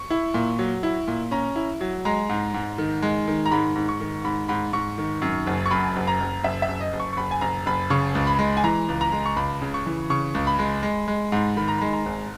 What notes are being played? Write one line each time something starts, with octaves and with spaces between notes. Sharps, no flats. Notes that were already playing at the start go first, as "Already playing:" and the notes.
Already playing: C#6
E4
A#2
F#3
E4
A#2
C#4 A#5
E4
F#3
G#3 A#5
G#2
G#2
D#3
G#3
D#3
A#5
G#2 B5
G#2
C#6
D#3
G#2 B5
G#2 B5
G#2 C#6
D#3
F#2
F#1
C#6
F#2 B5
F#1
A#5
F#1
F#1 E5
E5
F#1
D#5
F#1
C#6
C#6
F#1 B5
G#5
F#1 A#5
F#1 B5
C#3 C#6
C#2
B5
G#3
G#5
E3 A#5
C#2
A#5
G#3
C#6
C#2 B5
C#3
C#6
E3
C#3 C#6
C#2
B5
G#3
G#3
G#3
G#2
D#3 B5
A#5
G#3 B5
A#5
G#1